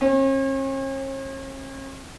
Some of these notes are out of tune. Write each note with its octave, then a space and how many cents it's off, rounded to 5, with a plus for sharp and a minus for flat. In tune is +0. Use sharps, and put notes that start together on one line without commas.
C#4 -45